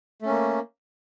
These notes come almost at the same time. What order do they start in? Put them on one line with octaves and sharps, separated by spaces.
A3 C#4 A#3